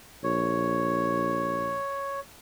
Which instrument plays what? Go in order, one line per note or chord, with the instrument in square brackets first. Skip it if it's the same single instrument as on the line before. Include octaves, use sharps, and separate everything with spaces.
[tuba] A#1 [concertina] C#5